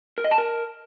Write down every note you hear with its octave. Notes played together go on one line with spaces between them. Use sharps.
A#4
D#5
A5
A#4